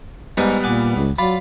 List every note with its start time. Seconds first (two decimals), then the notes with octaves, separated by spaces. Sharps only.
0.37 G#2 G3 B3 D#4 G#5
0.63 A#2 F#5 G#5 D6
0.96 C#2
1.18 F#3 F4 D5 B5